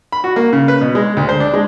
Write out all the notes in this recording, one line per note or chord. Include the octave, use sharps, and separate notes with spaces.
B5
F#4
A#3
C#3
B4
B2
G#3
D2
C5
D4
G#3